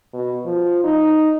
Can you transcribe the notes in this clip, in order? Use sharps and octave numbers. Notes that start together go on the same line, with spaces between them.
B2
F3
D#4